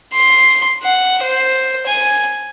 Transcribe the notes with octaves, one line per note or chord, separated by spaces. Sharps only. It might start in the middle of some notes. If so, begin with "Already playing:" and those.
C6
F#5
C5
G#5